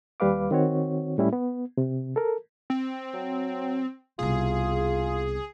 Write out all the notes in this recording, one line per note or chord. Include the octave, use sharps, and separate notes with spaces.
D#2 G3 B4 F5 D6
D#3 C4 F#4 C#5
A2 G3 C#4 E4
B3
C3
A4 A#4
C4
F#3
C2 B2 F4 G#4